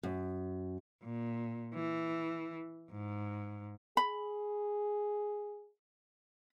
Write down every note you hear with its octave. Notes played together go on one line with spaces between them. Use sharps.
F#2
A#2
E3
G#2
G#4 B5